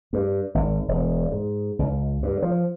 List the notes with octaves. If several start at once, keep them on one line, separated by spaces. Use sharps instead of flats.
G2
G#1
E1
G#2
C#2
G2
F3